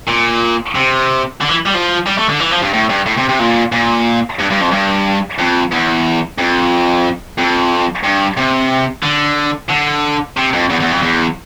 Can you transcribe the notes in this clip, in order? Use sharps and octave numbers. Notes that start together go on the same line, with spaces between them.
A#2
C3
D3
E3
G3
F3
G3
A3
D3
E3
F3
G2
A2
G2
A2
C3
C3
A#2
A#2
G2
G2
F2
G2
F2
E2
F2
F2
G2
C3
D3
D3
C3
F2
E2
E2
F2
E2